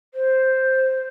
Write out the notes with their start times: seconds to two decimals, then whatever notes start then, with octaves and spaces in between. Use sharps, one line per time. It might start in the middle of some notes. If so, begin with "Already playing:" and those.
0.14 C5